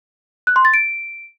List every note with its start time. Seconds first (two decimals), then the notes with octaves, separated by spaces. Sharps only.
0.47 F#6
0.56 C6
0.65 A6
0.74 D7